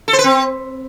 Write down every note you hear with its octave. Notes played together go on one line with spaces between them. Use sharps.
A4
C5
B4
C4